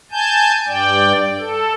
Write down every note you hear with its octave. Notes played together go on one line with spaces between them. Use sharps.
G#5 A5 G6
G2 D5 G5
A4